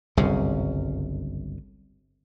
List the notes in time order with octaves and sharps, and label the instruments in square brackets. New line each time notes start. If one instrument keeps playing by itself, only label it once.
[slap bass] G1 C2 F#2 C#3